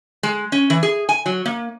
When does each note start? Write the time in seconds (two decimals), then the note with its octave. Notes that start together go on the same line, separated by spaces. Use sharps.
0.23 G#3
0.52 C#4
0.70 E3
0.83 G#4
1.09 G#5
1.26 F#3
1.46 A#3